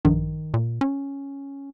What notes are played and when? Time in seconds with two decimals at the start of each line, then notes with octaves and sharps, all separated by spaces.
0.05 A#1 G2 D#3
0.54 A#2
0.81 C#4